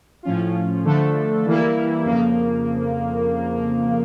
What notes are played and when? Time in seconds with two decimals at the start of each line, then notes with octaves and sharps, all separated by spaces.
0.23 A2 F3 C#4 F4
0.84 D3 F3 A3 D4 A4
1.45 E3 G3 A#3 E4
2.05 F2 C#3 F3 A#3